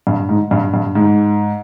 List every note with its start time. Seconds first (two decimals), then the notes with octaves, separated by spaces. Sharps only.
0.07 G2
0.29 G#2
0.51 G2
0.74 G2
0.95 G#2